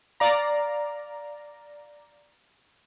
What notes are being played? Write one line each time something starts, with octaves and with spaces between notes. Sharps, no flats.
D5 F5 A#5